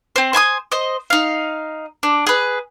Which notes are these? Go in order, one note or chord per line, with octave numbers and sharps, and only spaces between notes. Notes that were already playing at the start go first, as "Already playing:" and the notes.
C4 C5
C5 G#5 C6 D#6
C5 D#5
D#4 F5
D4
G#4 B4